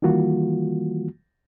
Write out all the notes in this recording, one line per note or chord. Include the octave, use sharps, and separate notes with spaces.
D#3 E3 G3 A#3 F4 F#4